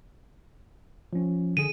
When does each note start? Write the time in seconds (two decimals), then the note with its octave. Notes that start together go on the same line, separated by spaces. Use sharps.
1.13 F3 C#4
1.57 D3 G#4 D#7